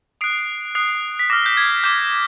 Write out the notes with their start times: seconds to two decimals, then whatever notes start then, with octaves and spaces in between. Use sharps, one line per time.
0.21 D#6 F#6 C7 D7
0.75 D#6 F#6 C7
1.19 B6
1.30 D6 F6 A#6
1.46 G6
1.57 G#6
1.84 D6 F6 G6